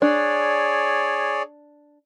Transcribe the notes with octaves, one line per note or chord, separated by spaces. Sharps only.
D4 G#4 C#5 D5